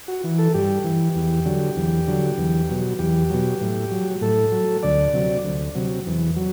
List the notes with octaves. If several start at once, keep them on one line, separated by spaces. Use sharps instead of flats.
F#4
E3
A4
G2 G4
E3
E2
D3 F#3
E2
D3 F#3
E2
B2 F#3
E2 G4
B2 F#3
A2
F#3
A2 A4
F#3
D2 D5
C3 F#3
D2
C3 F#3
E2
F#3